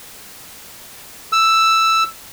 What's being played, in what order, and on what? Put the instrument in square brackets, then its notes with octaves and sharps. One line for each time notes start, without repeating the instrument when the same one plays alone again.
[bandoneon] E6